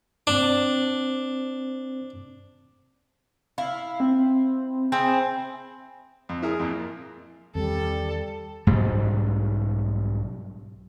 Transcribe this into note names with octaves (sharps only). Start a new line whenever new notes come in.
C4 D4 C5
E4 F5
C4
C4 E4 G#4
F2
E4 G#4 A#4 E5
F2 A#2
E2 D#3 G3 C4 A4
B1 G#2 G3